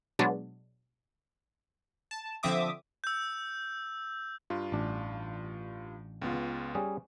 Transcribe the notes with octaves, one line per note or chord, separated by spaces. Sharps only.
B2 F#3 G#3 D4
A5
D3 F3 C4 E5 D6 D#6
E6 G6
G2 F4
A1 D4
C#2 B3 F4
G3 C#4 G#4